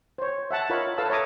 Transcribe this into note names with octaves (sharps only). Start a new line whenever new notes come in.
C5 C#5
E5 F#5 A5
F4 A#4 C#5 D#5 B5
A4 B4 F5 A5 E6
C#5 E5 A#5 D6 D#6